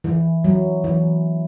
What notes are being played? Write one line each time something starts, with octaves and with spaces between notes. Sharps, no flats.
E3
F#3
E3